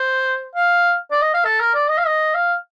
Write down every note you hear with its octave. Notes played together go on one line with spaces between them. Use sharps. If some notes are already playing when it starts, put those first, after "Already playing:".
Already playing: C5
F5
D5
D#5
F5
A4
A#4
D5
D#5
F5
D#5
F5